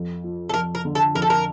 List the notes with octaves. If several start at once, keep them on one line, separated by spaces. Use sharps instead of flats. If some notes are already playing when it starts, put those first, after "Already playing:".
Already playing: F2
F3
A4
F2 A#4
A#4
D3
A4
F2 A#4
A4
A#4